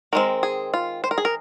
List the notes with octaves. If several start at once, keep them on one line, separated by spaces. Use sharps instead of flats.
D#3 G#3 C4 A#4
G#4
F4
C5
A#4
G#4
A#4